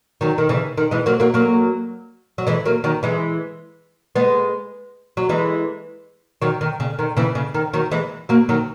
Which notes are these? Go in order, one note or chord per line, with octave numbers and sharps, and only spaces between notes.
D#3 F#3
D#3
C#3 E3
D#3
E3 G#3
F#3 A#3
F#3 A#3
F#3 A#3
F#3
E3 G#3
F#3 A#3
D#3 F#3
E3 G#3
G#3 B3
F#3
E3 G#3
D#3 F#3
D#3
C#3
D#3
C#3 E3
C#3
D#3
D#3 F#3
E3 G#3
F#3 A#3
D#3 F#3